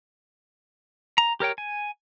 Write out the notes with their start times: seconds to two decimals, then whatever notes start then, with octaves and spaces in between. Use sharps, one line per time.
1.18 A#5
1.40 G4 A#4 C#5 G5
1.58 G#5